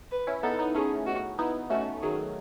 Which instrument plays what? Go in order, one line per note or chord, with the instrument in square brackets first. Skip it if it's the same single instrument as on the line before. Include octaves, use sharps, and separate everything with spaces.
[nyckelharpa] B4
[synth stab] C#4 E4
[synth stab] B3 D#4 [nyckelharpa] A4
[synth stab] B3 D#4
[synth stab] A3 C#4 [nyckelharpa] G#4
[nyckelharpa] F#4
[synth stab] B3 D#4 [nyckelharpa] E4
[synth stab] A3 C#4 [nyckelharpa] F#4
[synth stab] D#3 F#3 [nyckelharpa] G#4